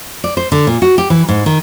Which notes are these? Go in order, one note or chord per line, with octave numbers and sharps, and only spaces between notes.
D5
C5
D3
A#2
F#4
G4
E3
G#2
D#3